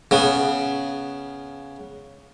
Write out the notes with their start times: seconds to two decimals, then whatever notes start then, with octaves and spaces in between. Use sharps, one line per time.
0.11 C#3 B3